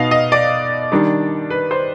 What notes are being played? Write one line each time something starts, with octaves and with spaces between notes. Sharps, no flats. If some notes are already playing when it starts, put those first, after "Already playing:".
Already playing: B2 B3 D#4 D#5 F5
D#5
D5
D#3 G3 D4
B4
C5